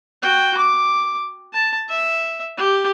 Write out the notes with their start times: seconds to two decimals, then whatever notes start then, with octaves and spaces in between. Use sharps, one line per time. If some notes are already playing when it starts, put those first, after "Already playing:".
0.22 F#4 G5
0.58 D6
1.53 A5
1.89 E5
2.57 G4